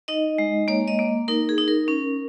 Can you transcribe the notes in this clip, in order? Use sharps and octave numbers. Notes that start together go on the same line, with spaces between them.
D#4 D#5
G#3
A#3 C#5
D#5
A#3
D#4 A#4
G#4
D#4
A#4
C#4